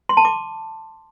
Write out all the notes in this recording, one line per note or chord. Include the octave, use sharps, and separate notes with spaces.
C6
A5
D6